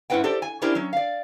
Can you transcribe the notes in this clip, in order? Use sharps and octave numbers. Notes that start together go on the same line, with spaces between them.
G#2 C#4 E4 B4 F#5 G5
G4 A4 C5 D5
G#5
C#4 D4 E4 G4 A#4 C5
F#3 C#4
D5 F5